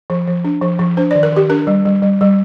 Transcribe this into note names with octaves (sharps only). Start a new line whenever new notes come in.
F3
F3
D4
F3
F3
D4 C5
D5
D#3
A#4
D#3 G4
D4 A#4
G3
G3
G3
G3